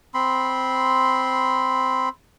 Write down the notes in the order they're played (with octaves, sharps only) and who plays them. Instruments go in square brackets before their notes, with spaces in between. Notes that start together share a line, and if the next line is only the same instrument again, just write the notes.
[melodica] C4 B5 C6